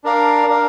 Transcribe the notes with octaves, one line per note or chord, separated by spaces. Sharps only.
D4 A#4 D5 F5
D4 A#4 D5 F5